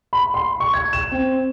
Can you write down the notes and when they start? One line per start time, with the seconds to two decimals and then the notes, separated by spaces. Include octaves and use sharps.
0.13 B5
0.34 C6
0.60 C#6
0.74 G#6
0.93 E7
1.12 C4